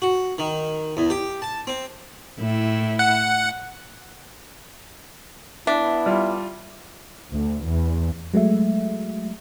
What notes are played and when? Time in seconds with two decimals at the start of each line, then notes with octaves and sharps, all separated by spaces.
0.02 F#4
0.38 D#3
0.97 E2
1.10 G4
1.42 A5
1.67 C4
2.39 A2 E4
2.99 F#5
5.67 B3 D4 E4 E5
6.06 G3 F4
7.31 D2
7.66 E2
8.34 F#3 G#3 A3 E5